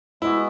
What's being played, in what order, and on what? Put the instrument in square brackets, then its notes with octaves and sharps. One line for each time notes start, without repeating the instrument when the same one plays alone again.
[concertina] G#3 B3 F#4 [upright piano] E4